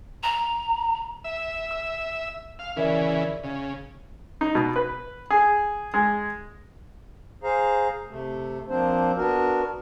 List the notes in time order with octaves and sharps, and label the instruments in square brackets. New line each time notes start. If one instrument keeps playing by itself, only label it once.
[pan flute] A#5
[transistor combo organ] E5
[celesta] E6
[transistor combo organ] F5
[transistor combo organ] C#3 E3 [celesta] A#4 D5 E5
[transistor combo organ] C#3 [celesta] F5
[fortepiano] D#4
B2
B4
G#4
G#3
[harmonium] G#4 C5 F5 A#5
C3 A3
F3 A#3 C4 D4 C5
B3 D4 F#4 A#4